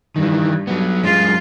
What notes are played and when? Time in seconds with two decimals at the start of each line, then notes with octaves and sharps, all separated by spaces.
0.16 G2 D#3 E3
0.67 F#3 B3
1.04 F#2 G#3 F4 F5